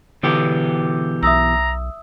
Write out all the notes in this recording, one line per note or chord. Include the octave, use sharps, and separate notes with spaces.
B2 D3 E3 G4
B1 E5 A#5 D#6 E6